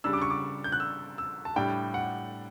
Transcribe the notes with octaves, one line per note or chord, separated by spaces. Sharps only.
C#3 G3 D4 E6
D6
C#6
D6
G6
F#6
E6
E6
A5
A2 G3 D4 G5
F#5